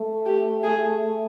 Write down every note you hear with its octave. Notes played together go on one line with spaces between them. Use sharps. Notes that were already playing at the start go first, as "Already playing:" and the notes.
Already playing: A3
G4
G#4